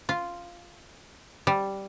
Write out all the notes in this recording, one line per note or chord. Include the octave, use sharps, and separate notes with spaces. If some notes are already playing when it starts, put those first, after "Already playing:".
F4
G3